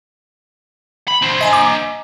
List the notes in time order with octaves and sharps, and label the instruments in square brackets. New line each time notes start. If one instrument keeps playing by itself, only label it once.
[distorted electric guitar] B5
D4 C5
[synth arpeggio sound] D#5 G#5 A#5
D6